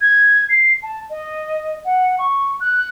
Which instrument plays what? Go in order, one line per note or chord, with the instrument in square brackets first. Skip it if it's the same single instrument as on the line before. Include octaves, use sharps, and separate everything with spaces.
[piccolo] G#6
C7
A5
D#5
F#5
C#6
F#6